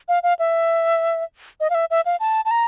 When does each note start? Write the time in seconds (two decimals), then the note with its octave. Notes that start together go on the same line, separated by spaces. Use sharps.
0.08 F5
0.23 F5
0.39 E5
1.60 D#5
1.70 F5
1.75 E5
1.91 E5
2.06 F5
2.20 A5
2.45 A5
2.51 A#5